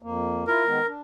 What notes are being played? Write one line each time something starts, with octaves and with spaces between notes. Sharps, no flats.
F2 A#3
E4 F4 A#4
D#3 G#3 B3
D4